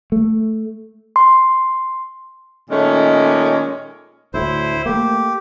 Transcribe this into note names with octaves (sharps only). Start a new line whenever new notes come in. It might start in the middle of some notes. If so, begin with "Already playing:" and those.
A3
C6
A#2 D#3 G#3 A3 C#4
D2 A2 E4 C5
A3 A#3 G4